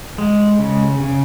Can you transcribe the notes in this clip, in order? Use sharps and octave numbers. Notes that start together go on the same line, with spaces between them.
G#3
C#3
C#3